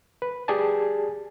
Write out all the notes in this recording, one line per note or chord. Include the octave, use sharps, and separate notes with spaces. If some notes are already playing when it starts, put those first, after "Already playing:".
B4
G4 G#4 D5 G#5 A5